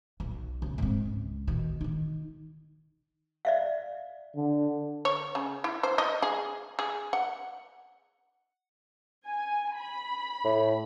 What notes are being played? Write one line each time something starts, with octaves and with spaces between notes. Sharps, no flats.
B1
C#3
G#2 C4
C#2
B2 D#3
D#3 D#4
D5 E5 F5
D3
C#5
C#3
E4
C5
D#5
G#4
G#4
F#5
G#5
B5
A2